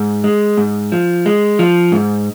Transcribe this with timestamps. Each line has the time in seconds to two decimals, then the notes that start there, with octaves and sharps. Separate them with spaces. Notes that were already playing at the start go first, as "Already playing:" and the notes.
Already playing: G#2
0.24 G#3
0.57 G#2
0.92 F3
1.26 G#3
1.59 F3
1.92 G#2